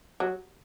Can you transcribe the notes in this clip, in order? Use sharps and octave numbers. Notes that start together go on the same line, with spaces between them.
F#3